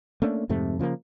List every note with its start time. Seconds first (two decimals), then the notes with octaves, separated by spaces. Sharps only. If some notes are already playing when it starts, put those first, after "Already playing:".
0.22 A3 A#3 C#4 D4
0.49 F2 G#2 C3 A3
0.79 C#3 F3 A3 A#3